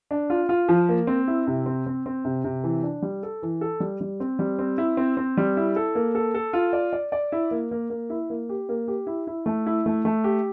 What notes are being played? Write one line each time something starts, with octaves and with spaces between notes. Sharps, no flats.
D4
F4
F4
F3
A#3
C4
E4
C3
C4
C4
C4
C3
C3
E3
D4
G3
A4
E3
A4
G3
G3
C4
G3
C4
E4
C4
C4
G3
E4
A4
A#3
A4
A4
F4
D5
D5
D5
E4
A#3
A#3
A#3
E4
A#3
G4
A#3
G4
E4
E4
A3
E4
A3
A3
G4